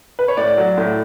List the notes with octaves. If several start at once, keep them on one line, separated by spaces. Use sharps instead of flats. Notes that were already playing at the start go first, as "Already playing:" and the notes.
B4
C#5
A2 D5
F#3
A2